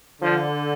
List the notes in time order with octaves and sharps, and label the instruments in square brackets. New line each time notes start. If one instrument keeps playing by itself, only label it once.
[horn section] D3 [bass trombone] F3